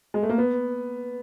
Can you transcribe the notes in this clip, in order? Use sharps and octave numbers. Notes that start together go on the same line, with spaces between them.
G#3
A3
A#3
B3